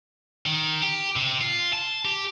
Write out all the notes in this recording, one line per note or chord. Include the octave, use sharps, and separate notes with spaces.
D#3
G4
C3
F4
A5
G4